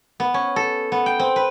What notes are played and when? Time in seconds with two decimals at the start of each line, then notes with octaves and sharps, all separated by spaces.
0.20 B3
0.34 C#4
0.56 A4
0.92 B3
1.06 G5
1.19 C4
1.36 B4